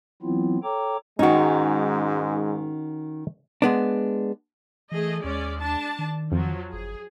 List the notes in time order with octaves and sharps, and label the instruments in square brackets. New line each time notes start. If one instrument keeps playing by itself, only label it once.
[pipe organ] E3 F#3 B3 C4 E4 F4
A4 C#5 G5 A#5 D6
[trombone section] G#2 G#3 [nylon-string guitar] D#3 C#4 [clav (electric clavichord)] D#4 F#4
[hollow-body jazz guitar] G#3 B3 D4
[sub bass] E3 [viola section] A3 G#4 D#5
[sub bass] D#2 [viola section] G#3 C#4 D5
[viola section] D4 A5
[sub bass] D#3
[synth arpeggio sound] F2 [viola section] F3 F#3
[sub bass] G1 [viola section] G#4